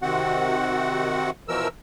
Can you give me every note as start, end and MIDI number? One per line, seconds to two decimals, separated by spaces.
0.02 1.30 48
0.02 1.30 51
0.02 1.30 60
0.02 1.30 66
0.02 1.30 78
1.49 1.68 47
1.49 1.68 52
1.49 1.68 53
1.49 1.68 70
1.49 1.68 88